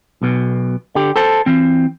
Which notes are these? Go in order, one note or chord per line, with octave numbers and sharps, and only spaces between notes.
B1 B2
D3 G4
A4 C5 A5
E3 C4